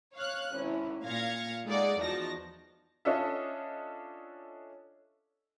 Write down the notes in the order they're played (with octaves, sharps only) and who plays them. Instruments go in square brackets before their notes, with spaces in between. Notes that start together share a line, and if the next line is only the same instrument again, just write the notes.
[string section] C#5 F5 F6 F#6
G#1 C#4 E4
A#2 F5 G#6 A#6 C#7
G#3 D#4 G#4 A4 D5 F#5
E2 F3 D#4 F#4 A5 A#6
[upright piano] C#4 D4 F4 A4 D#5 E5